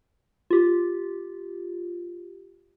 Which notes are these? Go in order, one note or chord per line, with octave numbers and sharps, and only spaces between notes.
F4 G4